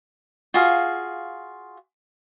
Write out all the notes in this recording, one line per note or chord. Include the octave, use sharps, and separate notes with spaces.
F4 F#4 G#4 F5